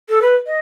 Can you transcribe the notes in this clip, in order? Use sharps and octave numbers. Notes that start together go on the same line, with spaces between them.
A4
B4
D#5